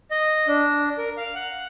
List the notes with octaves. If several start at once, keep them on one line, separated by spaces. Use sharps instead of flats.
D#5
D4
A#4
F5
F#5